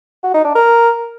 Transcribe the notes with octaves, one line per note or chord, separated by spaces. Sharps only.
F#4
D#4
D4
A#4